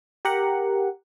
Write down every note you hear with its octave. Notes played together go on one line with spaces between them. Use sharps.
G4 A#4 F#5